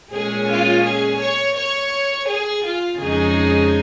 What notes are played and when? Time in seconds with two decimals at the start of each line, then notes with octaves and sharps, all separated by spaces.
0.11 A#2 G#3 C#4 G#4
0.47 F4
0.83 G#4
1.19 C#5
1.55 C#5
2.27 G#4
2.64 F4
2.99 F2 C#3 F3 G#3 D#4 G#4